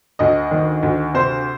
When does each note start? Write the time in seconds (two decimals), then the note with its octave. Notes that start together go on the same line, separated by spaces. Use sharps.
0.19 D2 D#5
0.51 D#3
0.83 D2
1.14 C3 C5